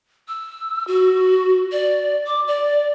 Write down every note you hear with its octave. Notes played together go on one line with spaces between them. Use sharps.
E6
F#4
D5
D6
D5